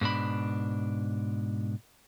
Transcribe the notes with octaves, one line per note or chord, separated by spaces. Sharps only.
G#2 B2 D4 B5